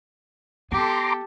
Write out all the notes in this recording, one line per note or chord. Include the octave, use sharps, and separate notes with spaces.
B3 G4 A4 A#5 C6 D6